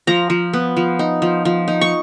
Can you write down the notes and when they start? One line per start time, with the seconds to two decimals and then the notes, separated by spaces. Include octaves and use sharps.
0.07 F3 A#5
0.30 F3
0.53 B3
0.77 F3
0.99 D#4
1.22 F3
1.45 F3
1.68 D#4
1.81 C#6